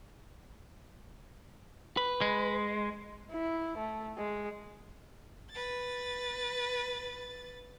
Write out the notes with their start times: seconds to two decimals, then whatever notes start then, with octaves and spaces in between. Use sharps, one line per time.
1.97 B4
2.21 G#3
3.31 E4
3.78 A3
4.18 G#3
5.51 B4 A6